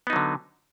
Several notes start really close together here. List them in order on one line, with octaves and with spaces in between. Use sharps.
B3 D#4 F#3 D3